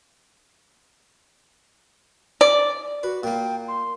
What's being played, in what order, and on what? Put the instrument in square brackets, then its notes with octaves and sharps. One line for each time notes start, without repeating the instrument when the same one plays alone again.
[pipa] D5
[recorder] F#4 [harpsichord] B4
[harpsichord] A#2 A#3 [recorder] G5
[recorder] C6